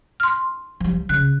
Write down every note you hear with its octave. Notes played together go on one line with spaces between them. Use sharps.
C6 F6
F3 G3
C#3 F#6